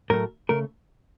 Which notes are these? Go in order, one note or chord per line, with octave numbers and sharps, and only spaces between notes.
A2 F#3 A3 A#4
C#3 A3 A#4